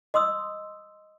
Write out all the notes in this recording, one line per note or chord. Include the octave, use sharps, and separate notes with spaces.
D#5 C6 D#6 E6